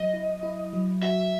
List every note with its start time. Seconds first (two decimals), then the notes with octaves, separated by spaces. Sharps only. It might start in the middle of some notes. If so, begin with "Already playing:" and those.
Already playing: F#3 D#5
0.14 E4
0.43 E4
0.73 F#3
1.02 F#4 E5